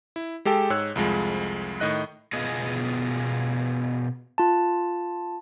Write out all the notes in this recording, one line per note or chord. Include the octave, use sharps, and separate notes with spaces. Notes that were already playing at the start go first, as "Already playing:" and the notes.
E4
G#3 G4 A4 G5
G#2 C#5 E6 F#6
C2 F2 F3 G#3
A2 D#3 D#5 F#6
B2 B3 F4 G#4 D#5 G#5
F4 A5